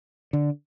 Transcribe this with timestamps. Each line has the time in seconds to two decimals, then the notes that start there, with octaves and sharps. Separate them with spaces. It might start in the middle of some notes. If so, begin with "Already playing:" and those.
0.33 D3